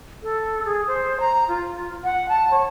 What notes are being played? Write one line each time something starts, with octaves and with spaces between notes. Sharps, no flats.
A4
G#4
C5
A#5
F4
F#5
A5
C#5